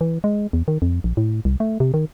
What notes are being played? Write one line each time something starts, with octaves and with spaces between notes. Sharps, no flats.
E3
G#3
E2
D#3
F2
A#1
A2
C2
A3
C3
D#3